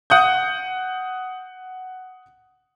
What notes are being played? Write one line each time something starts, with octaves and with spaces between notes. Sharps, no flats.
F#5 D#6 G6